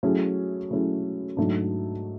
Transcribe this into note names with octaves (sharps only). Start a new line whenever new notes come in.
F#3 A3 C#4 E4 G#4
F#3 A3 C#4 E4 G#4
G#2 F#3 A3 D4